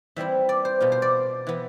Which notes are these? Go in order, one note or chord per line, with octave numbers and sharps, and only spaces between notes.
E3 G3 C4 E4 E5
D5
C5
B2 B3 F4
C5
D5
E3 B3